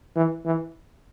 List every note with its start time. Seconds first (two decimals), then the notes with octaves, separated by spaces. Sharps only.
0.16 E3
0.45 E3